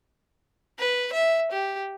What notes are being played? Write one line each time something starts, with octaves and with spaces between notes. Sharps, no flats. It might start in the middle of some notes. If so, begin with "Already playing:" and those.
B4
E5
G4